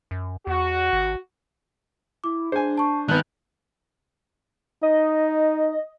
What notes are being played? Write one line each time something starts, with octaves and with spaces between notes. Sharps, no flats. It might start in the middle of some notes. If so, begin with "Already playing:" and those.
F#2
E2 F#4
G#1
E4 D6
D4 G#4 C5 G#5
A5 C#6
G#1 D#3 B3 F#6 G6
D#4 D#5